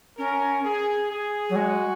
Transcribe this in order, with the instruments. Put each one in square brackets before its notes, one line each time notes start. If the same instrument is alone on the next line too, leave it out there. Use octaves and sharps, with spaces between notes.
[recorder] C#4 [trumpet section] A#4
[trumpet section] G#4
G#4
[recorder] F#3
[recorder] G#3 [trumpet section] F#4